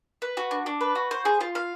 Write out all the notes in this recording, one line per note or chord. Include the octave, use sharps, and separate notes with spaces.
B4
F#4
D4
D4
B4
F#4
C5
G#4
F4
F5